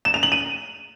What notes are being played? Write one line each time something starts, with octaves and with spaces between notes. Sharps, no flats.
E7
F7
F#7
D#7